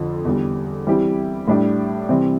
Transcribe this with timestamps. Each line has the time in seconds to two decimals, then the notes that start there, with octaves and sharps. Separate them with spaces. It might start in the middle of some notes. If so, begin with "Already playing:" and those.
Already playing: F2 D3 F3
0.25 E2 D3 G3
0.87 E3 G3 C4 E4 G4
1.47 A2 G3 D4 G4
2.09 C3 E3 G3 C4